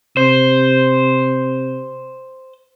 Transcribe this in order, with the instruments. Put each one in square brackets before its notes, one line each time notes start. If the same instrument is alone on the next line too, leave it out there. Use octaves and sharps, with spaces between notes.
[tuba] C3 [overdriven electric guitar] C5